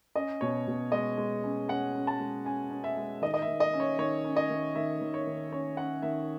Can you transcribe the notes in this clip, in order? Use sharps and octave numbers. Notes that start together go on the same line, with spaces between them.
C#4 D#5
B2 C#5
B2
G#3 D#5
G#3
C#4
C#4 F#5
C#4
A5
G#3
C#4 G#5
C#4
E5
G#3
D#3 D#5
D#5
E5
D#3
D#5
C#4
C#5
D#3 C#5
C#4
D#5
D#3
D#3 E5
D#3
C#5
D#3
C#4 C#5
C#4 F#5
D#3 E5